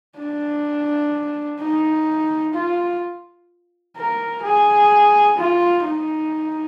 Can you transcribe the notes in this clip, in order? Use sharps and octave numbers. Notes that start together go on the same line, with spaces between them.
D4
D#4
F4
A#4
G#4
F4
D#4